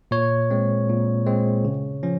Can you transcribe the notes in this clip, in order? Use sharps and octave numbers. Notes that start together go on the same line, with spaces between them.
A#2 C#5
G#3 C4
A#2
G#3 C4
C#3
F3 C#4